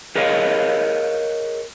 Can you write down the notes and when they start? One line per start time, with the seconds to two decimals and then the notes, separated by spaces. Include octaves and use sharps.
0.16 G#4 A#4 C#5 D#5 F5